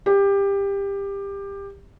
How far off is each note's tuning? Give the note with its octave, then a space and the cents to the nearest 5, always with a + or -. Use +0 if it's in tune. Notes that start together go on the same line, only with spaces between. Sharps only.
G4 +20